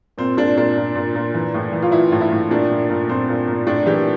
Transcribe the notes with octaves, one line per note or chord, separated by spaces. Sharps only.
A#2 C4
A#2 D4
A#2 D4
A#2
A#2
A#2
E3
A2
E3
F4
E3 E4
A2
E4
A2
A#2 D4
A#2
A#2
A#2 C4
A#2
A#2
A2 D4
E3 G4